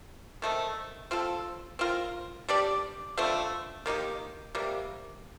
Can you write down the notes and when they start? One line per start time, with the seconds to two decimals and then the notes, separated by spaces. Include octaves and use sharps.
0.42 D#3 A3 C4 D#4
1.11 C4 F4 A4
1.79 C4 F4 A#4
2.49 G3 D4 G4 D5
3.17 D3 F3 A3 C4
3.86 D#3 A#3 D#4 G4
4.55 C3 G3 A#3